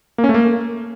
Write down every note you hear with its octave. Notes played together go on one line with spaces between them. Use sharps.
A#3
C#4
A3
A#3